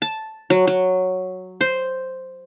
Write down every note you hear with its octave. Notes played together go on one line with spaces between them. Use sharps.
A5
F#3
F#3
C5